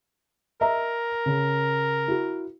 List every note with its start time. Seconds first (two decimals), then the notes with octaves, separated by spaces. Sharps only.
0.61 A#4 D#5 E5 A#5
1.26 C#3
2.08 E4 F#4